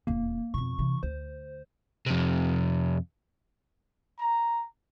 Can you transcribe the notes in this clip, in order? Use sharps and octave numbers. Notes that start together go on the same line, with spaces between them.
D#1 E2 A#3
F2 B2 C#6
C3 E3
D2 C5
F2 C3
A#5